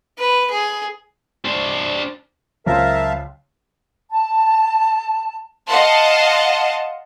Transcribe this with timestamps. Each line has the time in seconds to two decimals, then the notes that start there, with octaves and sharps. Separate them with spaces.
0.18 B4
0.51 G#4
1.45 D4 C5
2.66 C#2 F#3 A#4 C5 E5 F5 A5
4.11 A5
5.67 D#5 F5 F#5 A5 C6